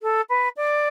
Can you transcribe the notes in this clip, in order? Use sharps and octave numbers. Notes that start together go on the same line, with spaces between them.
A4
B4
D5